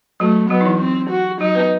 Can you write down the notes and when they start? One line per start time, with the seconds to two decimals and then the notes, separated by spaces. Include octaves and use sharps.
0.20 F#3 A3 F#4
0.50 F#3 B3 F#4
0.61 D#4
0.65 E3 E4
0.80 C4
1.10 F#4
1.40 F#3 D#4 F#4
1.55 B3 B4